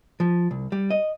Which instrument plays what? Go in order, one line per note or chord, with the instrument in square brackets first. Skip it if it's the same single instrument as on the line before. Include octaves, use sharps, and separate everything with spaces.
[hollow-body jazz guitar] F3
C2
G3
D#5